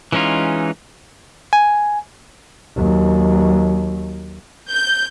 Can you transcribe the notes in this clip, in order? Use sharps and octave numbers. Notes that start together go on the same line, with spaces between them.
E3 G#3 C#4 D#4 F4
G#5
D#2 F#3
G6